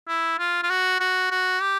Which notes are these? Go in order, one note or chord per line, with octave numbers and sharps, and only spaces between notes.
E4
F4
F4
F#4
F#4
F#4
G4